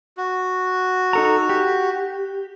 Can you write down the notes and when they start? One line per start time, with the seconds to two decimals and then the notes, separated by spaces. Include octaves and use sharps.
0.17 F#4
1.13 D#4 A4 A#5
1.49 G4